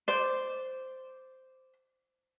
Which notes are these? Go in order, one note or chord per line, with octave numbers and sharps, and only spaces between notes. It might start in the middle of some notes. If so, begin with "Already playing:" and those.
C5 D5